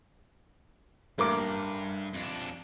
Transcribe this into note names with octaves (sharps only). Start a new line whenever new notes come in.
A1 G2 A#3 D6
F2 D4